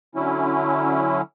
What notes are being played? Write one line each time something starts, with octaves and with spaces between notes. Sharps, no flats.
D3 F#3 C#4 E4